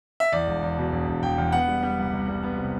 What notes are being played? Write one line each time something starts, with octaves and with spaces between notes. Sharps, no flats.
E5
E2 D5
E1
E2
B2
E1
E1
E1 G5
E2
B3 F#5
G3
G3
C2
C2
G3
B3
C3